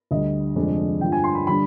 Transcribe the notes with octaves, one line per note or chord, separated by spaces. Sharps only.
D2 D3 G3 D#5
F1 F2 D3 G#3 D4
G2 D3 F3 G5
G#5
C6
B5
D3 G3 D4 B5